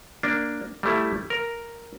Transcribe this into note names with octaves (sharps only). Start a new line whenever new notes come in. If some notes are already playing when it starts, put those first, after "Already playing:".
A#3 D4
G3 A3 E4
A#4